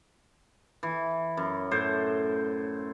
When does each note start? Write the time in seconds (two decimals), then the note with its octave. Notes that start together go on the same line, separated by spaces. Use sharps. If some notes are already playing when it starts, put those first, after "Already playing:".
0.83 E3
1.37 F#2
1.71 A2 C5